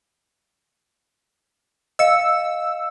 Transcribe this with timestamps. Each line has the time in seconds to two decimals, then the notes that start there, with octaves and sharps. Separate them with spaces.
1.99 D#5 F5 E6 C#7